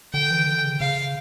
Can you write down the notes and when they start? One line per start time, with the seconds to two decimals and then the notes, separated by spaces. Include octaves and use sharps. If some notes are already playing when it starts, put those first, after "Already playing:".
0.14 D3 G5
0.31 E3
0.47 D3
0.64 C#3
0.80 C#3 F5